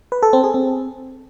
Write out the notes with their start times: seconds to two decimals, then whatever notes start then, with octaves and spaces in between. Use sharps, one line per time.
0.12 B4
0.23 A4
0.33 C4
0.44 G#4
0.54 C4